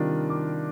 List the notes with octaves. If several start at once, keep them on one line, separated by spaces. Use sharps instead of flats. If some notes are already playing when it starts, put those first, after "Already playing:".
Already playing: C3 D#3 G3 D4 F4
D6